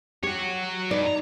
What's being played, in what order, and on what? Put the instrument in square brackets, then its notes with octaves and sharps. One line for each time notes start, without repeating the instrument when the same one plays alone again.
[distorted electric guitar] F#4 C#5 [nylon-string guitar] G4
[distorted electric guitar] G2 [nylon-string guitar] D#4 D5
[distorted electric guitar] A#5